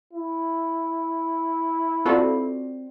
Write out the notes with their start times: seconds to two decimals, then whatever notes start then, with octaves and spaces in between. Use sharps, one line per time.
0.13 E4
2.06 C4 F4 F#4 A4 D5 B5